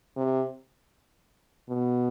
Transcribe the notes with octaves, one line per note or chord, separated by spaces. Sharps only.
C3
B2